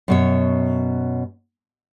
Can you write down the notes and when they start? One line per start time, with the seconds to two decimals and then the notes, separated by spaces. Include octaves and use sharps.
0.08 F#2 B2 C#5